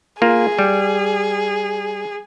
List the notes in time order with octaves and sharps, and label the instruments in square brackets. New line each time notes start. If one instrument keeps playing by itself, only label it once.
[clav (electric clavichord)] A#3 F4 [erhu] G#4
[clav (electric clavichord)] G3